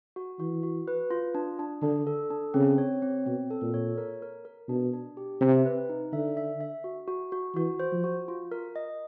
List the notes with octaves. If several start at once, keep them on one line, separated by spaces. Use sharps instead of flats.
F#4
E3 F#4
F#4
B4
F4
D4
D4
D3 D4
A4
D4
C#3 C4
C#5
C4
B2 C4
A4
A#2
C#5
A#4
A#4
A#4
B2 D4
D4
G4
C3 E5
B4
D#4
D3 E5
E5
E5
F#4
F#4
F#4
E3 F#4
C5
F3
F#4
F4
A#4
D#5